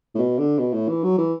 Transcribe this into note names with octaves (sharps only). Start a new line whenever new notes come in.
A2
B2
D3
B2
A2
E3
F#3
E3